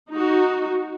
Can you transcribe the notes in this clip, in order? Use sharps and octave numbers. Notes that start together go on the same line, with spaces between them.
D#4 F#4